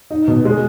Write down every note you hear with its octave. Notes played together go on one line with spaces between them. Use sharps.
D#4
B2
G#3